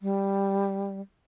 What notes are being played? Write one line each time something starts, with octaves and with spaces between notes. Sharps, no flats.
G3